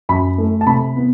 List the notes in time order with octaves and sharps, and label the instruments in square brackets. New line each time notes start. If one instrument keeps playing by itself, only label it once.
[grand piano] F#2 B5
A3
A5
C3 B5
B3